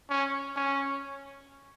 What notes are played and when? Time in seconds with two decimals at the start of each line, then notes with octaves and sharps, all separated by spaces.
0.10 C#4
0.56 C#4